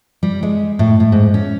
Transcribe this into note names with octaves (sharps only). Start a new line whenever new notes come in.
G3
G#3
A2
A2
G#2
C#4